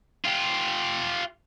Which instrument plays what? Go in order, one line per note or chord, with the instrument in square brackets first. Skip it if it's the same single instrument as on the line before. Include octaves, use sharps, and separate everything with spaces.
[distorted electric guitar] F4 G4